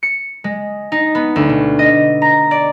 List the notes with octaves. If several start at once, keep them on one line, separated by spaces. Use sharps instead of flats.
C#7
G#3
D#4
B3
D2
B2
D#5
A#5
D5